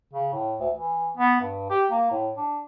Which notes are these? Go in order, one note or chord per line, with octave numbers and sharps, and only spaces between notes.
C#3
A2
D2
E3
B3
G2
G4
A#3
A2
D4